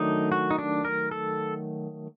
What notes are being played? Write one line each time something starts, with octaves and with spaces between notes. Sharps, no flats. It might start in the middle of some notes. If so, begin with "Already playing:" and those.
Already playing: D#3 F#3 A3 D4 D#4
F#4
D#4
D4
A#4
A4